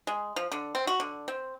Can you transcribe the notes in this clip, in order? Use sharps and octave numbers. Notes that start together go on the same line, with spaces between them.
G#3
F3
D3
C4
F#4
D3
C4